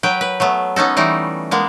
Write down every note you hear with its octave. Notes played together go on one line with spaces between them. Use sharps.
F#3 B4 G5
B4
F#3 A3 B3
B3 C#4 D#4 A4
E3 G3 A3 D#4
G#3 A#3 B3